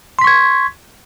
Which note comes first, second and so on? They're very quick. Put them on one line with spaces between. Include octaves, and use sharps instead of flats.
C6 B6 C#6 G#6